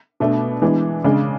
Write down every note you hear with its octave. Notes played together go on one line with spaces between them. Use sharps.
B2 A3 D4
E3 G#3 B3 D4
C#3 G#3 D4